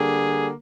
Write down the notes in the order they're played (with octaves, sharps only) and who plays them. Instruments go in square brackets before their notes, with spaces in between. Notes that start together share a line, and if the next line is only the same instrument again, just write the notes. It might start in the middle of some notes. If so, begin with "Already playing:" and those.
Already playing: [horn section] D3 G3 A#3 G#4